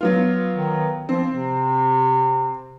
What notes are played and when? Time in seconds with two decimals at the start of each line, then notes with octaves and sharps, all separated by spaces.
0.01 F#3 B3 F4
0.53 D#3
1.09 F3 C4
1.29 C3